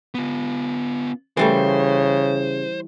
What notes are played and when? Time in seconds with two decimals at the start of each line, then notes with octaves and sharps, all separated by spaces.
0.14 B3 F4
1.37 C#3 E3 G3 A3 C5